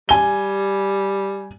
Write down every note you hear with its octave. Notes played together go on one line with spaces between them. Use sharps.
G3 G#5 G7